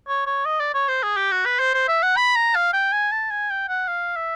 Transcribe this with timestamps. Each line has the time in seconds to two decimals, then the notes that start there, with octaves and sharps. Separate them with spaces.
0.08 C#5
0.27 C#5
0.45 D#5
0.60 D5
0.74 C#5
0.88 C5
1.03 G#4
1.17 G4
1.31 F#4
1.46 B4
1.59 C5
1.74 C5
1.88 E5
2.03 F#5
2.17 B5
2.36 A#5
2.55 F5
2.73 G5
2.92 G#5
3.12 A5
3.31 G#5
3.50 G5
3.69 F#5
3.88 F5
4.16 E5